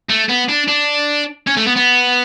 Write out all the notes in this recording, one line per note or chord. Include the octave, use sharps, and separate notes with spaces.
A3
B3
D4
D4
C#4
A3
B3
B3